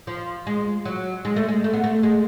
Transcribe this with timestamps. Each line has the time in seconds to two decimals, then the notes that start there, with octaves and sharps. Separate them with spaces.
0.07 F3
0.47 G#3
0.85 F#3
1.25 G#3
1.36 A3
1.49 G#3
1.64 A3
1.74 B3
1.84 A3
2.03 G#3